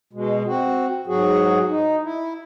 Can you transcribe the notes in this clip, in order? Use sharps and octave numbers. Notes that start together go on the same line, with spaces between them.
B2 G#3
C4 F#4
G#2 F#3 F#4 G#4
D#4
E4